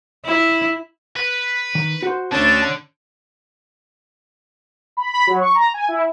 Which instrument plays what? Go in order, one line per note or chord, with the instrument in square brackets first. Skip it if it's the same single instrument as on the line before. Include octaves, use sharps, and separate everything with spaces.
[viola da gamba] E4
[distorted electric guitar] B4
[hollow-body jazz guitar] D#3
F#4 C5
[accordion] D2 A5 [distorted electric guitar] D3 [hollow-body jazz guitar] C#4 D4
[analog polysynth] B5
B5
F#3
C#6
A#5
G#5
E4